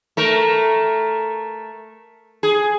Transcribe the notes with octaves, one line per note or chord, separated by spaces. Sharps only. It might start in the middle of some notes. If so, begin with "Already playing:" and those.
A3 A#4
G#4